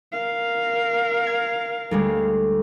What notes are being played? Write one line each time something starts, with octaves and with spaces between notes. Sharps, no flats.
A#4 F5
G#6
D2 G3 G#3